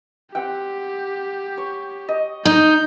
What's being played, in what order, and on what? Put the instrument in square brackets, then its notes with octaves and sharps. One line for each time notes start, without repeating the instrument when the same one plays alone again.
[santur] C4 F#5 G5 [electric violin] G4
[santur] C#5
D#5
[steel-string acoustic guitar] D#4 [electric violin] G6